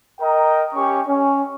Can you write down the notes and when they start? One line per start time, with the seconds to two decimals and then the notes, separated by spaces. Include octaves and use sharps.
0.21 A#4 D#5 G5 A#5
0.75 C#4 G4 C#6
1.08 C#4